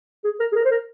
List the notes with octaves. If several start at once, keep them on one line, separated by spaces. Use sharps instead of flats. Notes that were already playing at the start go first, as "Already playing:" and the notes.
G#4
A#4
G#4
A#4
C5
A#4